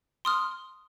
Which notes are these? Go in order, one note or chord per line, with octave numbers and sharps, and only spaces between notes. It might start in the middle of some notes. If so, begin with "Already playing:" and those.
C6 D#6 F6